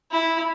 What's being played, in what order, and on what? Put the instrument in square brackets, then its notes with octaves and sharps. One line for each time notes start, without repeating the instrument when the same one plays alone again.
[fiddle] E4